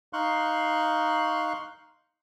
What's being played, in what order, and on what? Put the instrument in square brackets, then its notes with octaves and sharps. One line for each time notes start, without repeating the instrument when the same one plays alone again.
[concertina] D#4 F5 C6 C#6 F#6